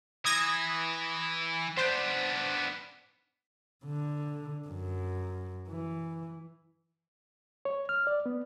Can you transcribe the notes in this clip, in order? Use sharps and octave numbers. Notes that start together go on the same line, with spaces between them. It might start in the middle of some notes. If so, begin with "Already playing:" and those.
E3 D#6 G#6 A#6
B3 D4 C5
D3
F#2
E3
C#5
F6
D5
B3